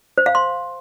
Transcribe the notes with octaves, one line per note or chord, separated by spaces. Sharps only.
C5
F5
C6